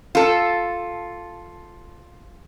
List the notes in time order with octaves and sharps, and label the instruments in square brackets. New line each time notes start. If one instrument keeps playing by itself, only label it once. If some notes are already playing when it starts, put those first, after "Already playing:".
[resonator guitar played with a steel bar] F4 A4